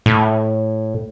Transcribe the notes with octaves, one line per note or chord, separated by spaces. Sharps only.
A2